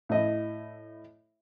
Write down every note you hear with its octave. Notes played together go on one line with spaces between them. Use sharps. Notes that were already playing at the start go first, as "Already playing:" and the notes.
A2 E4 D#5